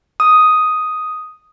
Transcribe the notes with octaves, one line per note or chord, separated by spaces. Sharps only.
D#6